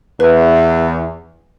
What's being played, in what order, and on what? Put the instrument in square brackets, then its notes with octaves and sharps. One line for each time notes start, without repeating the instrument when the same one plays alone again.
[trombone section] E2 [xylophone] B4